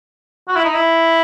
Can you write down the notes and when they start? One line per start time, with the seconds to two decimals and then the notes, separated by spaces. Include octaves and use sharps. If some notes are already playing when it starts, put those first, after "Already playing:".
0.48 F#4
0.56 E4
0.65 D#4
0.74 E4